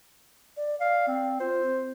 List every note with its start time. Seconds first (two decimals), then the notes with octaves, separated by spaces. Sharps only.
0.57 D5
0.80 D5 F5
1.07 C4
1.40 F4 C5
1.62 C4